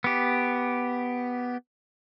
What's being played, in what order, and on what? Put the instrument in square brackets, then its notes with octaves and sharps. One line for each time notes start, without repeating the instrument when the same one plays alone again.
[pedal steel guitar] B3 G4